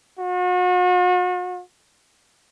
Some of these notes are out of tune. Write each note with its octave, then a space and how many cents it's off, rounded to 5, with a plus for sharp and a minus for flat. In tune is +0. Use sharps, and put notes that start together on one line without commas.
F#4 -40